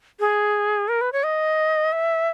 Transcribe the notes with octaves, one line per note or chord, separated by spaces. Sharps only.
G#4
A#4
B4
C#5
D#5
E5